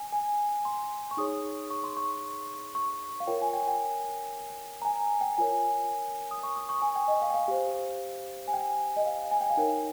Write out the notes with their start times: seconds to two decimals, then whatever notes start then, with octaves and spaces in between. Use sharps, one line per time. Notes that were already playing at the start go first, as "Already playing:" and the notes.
Already playing: G#5
0.13 G#5
0.65 C6
1.11 C#6
1.17 D#4 G#4 C#5 D#6
1.70 C#6
1.84 C6
1.97 C#6
2.75 C#6
3.20 F5
3.27 F4 A#4 C#5 G5
3.42 G#5
3.53 G5
3.68 G5
4.82 A#5
4.85 G#5
5.21 G5
5.38 F4 A#4 C#5 G#5
6.31 D#6
6.43 C#6
6.56 D#6
6.69 C#6
6.82 G#5
6.96 G5
7.08 D#5
7.22 F5
7.30 G5
7.34 F5
7.48 G4 C5 F5
8.48 G#5
8.53 G5
8.97 D#5
9.06 F5
9.31 G#5
9.41 G5
9.50 F5
9.57 D#4 A#4 C#5 G5